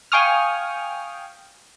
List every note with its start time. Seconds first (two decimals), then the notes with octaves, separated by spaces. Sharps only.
0.12 F5 G5 G#5 C#6 D#6 F6